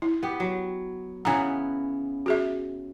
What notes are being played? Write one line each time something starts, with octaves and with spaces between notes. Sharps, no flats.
E4
B3 G4
F#3
C#3 E3 B3 G#5 A#5
F#4 G#4 E5